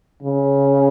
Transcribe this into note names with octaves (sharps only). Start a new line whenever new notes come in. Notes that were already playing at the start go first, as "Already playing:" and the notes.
C#3